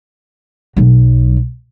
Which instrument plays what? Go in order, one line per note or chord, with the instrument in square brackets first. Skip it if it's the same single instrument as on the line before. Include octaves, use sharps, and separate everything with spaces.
[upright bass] B1 F#3